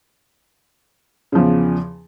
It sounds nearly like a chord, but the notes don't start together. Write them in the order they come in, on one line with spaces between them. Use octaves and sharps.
C#3 F3 E2